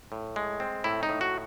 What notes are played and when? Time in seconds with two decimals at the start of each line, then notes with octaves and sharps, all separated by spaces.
0.12 A2
0.36 G#3
0.60 C4
0.84 A2 E4
1.03 D#4
1.09 A2
1.21 F#4